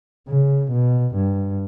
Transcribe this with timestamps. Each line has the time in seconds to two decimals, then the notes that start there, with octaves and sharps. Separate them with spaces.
0.28 C#3
0.72 B2
1.15 G2